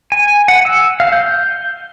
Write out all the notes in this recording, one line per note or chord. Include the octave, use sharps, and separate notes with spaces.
G#5
F#5
E6
F5
G6